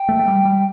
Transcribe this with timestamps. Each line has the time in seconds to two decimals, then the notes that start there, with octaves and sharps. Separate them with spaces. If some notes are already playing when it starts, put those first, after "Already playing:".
Already playing: G5
0.09 A3
0.19 A3
0.28 G3
0.45 G3